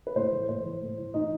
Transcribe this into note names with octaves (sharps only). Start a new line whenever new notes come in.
B4
A2 C5
E3
A2 C5
E3
A2
E3
A2 D#4 D#5